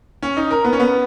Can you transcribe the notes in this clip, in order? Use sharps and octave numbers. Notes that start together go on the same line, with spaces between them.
C#4
D#4
A#4
B3
C#4
B3